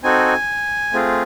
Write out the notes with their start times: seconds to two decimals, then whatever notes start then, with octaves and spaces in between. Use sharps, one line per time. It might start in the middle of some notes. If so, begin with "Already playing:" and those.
0.03 C4 D#4 F#4 A4 G#5
0.92 A3 C4 F4 G#4